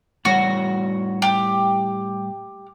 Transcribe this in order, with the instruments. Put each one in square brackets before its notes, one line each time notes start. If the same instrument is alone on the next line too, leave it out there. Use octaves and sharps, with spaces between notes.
[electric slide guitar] A2 G3 C#5 [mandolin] F#4
[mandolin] G4